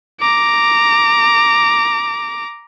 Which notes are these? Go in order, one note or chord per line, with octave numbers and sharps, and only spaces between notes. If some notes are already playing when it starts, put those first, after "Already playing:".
A#5 D6